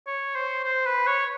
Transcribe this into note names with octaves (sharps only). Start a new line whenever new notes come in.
C#5
C5
C5
B4
C#5